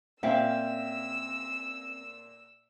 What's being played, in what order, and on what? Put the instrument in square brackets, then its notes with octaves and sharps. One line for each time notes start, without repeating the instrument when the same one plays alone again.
[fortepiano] A#2 [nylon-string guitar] C4 C#4 [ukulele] E5 F5 G5 [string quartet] E6